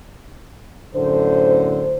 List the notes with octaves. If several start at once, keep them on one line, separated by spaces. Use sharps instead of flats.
F#2 A2 D3 C5